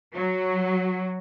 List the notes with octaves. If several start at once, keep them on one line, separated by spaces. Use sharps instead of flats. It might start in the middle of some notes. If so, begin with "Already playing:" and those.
F#3